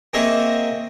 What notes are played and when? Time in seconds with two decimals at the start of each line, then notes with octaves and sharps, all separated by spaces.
0.13 A#3 C4 G#4 D#5 E5 C#6